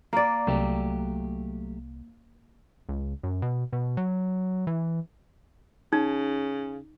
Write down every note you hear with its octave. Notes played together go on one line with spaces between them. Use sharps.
A#3 D5
C2 F#3 A3 G4
C#2
F#2
B2
B2
F#3
E3
C#3 D#4